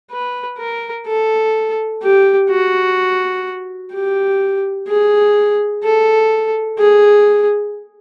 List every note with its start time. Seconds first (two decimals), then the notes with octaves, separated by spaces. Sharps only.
0.11 B4
0.58 A#4
1.06 A4
2.02 G4
2.50 F#4
3.92 G4
4.88 G#4
5.83 A4
6.79 G#4